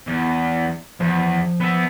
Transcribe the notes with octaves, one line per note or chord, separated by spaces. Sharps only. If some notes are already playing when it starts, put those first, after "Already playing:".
E2
E2 F3
B3 E5